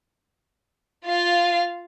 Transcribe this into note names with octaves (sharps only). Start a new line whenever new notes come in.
F4 F5